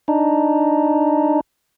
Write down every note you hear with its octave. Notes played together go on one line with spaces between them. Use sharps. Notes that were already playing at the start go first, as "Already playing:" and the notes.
D4 D#4